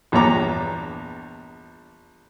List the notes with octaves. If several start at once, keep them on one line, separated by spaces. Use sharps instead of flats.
A#1 E2 G2 C#5 A#5 D6